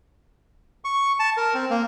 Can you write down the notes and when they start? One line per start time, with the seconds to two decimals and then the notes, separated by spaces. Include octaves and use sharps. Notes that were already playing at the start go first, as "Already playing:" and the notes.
0.84 C#6
1.19 A5
1.37 A#4
1.54 C4
1.70 A#3